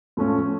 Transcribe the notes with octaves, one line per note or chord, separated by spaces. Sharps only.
A2 F3 A3 C#4 F4